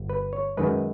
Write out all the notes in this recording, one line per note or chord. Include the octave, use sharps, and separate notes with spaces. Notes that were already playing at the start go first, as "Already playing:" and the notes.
Already playing: G1
B4
C#5
F#2 D#3 G#3 B4